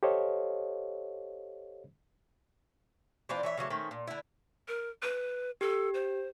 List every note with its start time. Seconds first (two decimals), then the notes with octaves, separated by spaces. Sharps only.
0.03 G4 A4 C5 C#5 D#5 F5
3.29 E3 C4 D4 F4
3.43 E3 C#5 E5
3.57 C#3 E3 F#3 A3
3.70 D#3 A3 C4 C#4
3.91 A#2
4.07 D3 E4
4.68 A#4
5.02 B4
5.61 G4 A4
5.94 C5